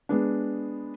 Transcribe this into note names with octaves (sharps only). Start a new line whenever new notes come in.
G#3 B3 D4